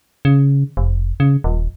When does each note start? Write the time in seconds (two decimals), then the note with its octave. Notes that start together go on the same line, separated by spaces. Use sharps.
0.25 C#3
0.77 F1
1.20 C#3
1.44 D#1